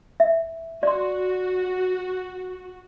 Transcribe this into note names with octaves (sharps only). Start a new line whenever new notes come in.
E5
F#4 D5 C6